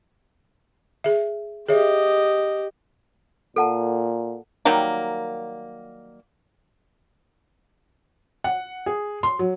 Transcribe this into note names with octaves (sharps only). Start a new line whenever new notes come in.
G#4 E5
G4 G#4 C#5 D#5 E5
A#2 A4 F#5 A5
D#3 F#3 G3 A#3
F#5
G#4
C6
F#3